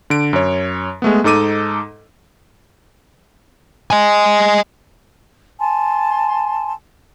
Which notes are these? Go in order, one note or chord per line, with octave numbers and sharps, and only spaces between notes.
D3 D7
F#2 C#5
G#3 A3 B3
G#2 D#4 A4 D6 D#7
D#5 G#5
G#5 A5 C6